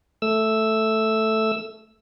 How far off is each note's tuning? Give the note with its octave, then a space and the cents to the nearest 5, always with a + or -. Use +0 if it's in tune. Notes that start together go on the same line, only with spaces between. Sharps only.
A3 +0 E6 +0